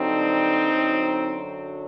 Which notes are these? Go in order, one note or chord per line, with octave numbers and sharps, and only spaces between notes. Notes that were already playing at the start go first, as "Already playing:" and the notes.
Already playing: G2 D3 F#3 C4 D#4
F#2 D3 F#3